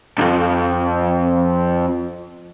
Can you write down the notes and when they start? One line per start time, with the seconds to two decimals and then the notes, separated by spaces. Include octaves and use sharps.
0.18 B1 F2